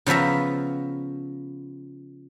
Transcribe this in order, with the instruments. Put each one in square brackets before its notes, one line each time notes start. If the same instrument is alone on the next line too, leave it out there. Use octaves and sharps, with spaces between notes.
[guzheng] C#3 F3 B3 E5 A#5